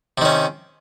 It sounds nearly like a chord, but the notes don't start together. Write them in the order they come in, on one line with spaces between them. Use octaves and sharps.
C3 D#3 C#4